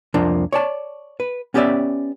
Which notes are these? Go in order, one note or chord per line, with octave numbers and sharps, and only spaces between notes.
C2 F2 F3 A#3 D4
C#5 D5 A5
B4
B3 C#4 G4 A#4 D5 E5